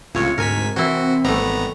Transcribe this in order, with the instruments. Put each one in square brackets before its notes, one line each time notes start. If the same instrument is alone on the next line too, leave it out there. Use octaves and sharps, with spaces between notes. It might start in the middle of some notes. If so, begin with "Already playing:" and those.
[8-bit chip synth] C#2 A2 [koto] C3 C#5 [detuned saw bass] F4
[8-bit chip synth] D2 G#5 B6 [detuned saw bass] G#2 [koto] A#4
[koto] E3 E4 [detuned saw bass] C4 [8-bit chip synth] F#4
[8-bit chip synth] G#1 B3 A#5 [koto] G3 A3